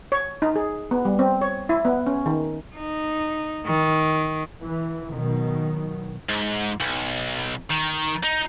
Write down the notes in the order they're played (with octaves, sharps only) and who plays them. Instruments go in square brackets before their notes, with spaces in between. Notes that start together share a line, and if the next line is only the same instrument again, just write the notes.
[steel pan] C#5
D#4
G#4
B3
G3
C4
C#5
E4
B3
C#4
D#3
[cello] D#4
D#3
[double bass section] E3
B2 D#3 F#3
[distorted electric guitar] G#2
B1
D#3
D#4